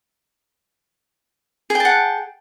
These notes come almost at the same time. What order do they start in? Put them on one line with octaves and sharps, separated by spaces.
G#4 G5 A5 F#5